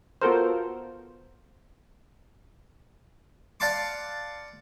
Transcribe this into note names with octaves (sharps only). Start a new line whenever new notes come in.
B3 F4 F#4 A4 A#4 C5
D5 F5 F#5 A5 C6 D6